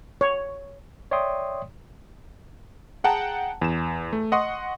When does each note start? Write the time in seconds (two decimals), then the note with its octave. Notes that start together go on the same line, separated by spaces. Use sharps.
0.21 C#5
1.11 C#5 D5 E5 G5 C6 D#6
3.04 G#4 F#5 G5 A5 A#5
3.62 E2 E7
4.13 A3
4.32 D#5 F#5 C6 C#6 D#6